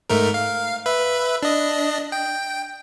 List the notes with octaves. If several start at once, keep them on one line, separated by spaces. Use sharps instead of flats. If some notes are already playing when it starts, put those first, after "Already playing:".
G#2 A3 A#4
F5
B4 E5
D4 D#5
G5